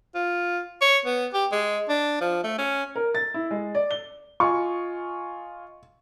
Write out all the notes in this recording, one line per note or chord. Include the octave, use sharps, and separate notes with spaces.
F4
C#5
B3
G4
G#3
D4
F3
A3
C#4
A#4
A6
E4
G#3
D5
G7
F4 D#5 G#5 C#6